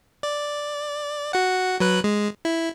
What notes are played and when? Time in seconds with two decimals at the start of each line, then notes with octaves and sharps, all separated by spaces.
0.23 D5
1.33 F#4 F#5
1.80 F#3 B4 F#6
2.04 G#3
2.45 E4